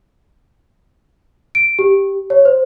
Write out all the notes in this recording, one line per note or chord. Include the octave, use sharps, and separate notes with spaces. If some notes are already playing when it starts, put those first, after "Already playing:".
D7
G4
C#5
C5